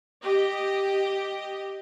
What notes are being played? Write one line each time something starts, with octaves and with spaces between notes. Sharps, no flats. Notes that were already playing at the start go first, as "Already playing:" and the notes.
G4 D#5